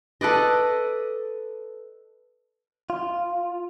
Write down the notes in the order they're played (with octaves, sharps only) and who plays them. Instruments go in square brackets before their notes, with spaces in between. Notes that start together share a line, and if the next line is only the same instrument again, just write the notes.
[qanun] A4 B4 D5 D#5
[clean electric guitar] F4